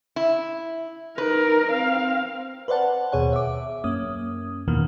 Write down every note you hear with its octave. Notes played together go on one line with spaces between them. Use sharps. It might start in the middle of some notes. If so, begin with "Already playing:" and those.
E4
D#4 A#4 B4
C4 F5
B4 C5 D5 F#5 A5
D#2 B2 G#4 C#5 F#5
E5 D6
F#2 A#3 C#4 D#6
E2 B2 D#3 E3 A#3